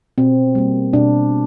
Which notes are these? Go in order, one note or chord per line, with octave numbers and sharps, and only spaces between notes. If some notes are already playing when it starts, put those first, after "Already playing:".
B2 C4
G3 A#3
B2 D4